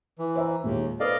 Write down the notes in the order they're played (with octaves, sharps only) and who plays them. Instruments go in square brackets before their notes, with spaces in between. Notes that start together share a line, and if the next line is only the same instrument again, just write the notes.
[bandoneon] E3
[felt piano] C5 E5 A#5
[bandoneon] D#2 [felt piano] A#2 G#3
[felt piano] A4 B4 C5 [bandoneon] D5 D#5 F5